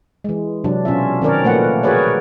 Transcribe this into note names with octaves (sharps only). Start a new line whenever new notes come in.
E3 G#3
C3 F#3 D4
B2 C#4 F4 E5
D#3 C4 C#4 A#4 C#5 D5
A#2 F3 A3 A#3 B4 F#5
F#4 G#4 A#4 B4 C#5 D5